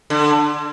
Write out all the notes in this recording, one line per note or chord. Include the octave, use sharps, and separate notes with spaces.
D3